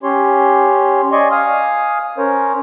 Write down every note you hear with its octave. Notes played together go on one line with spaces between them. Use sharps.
C#4 G4 C#5 C6
D5 D#5 G#5 C6 C#6
F5 G#5 D#6 F6
C#4 A#4 C5 C#5